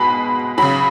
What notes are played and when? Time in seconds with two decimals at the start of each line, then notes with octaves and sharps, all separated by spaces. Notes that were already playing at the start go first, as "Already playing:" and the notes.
Already playing: B2 G#3 B5
0.58 C#3 F#3 B5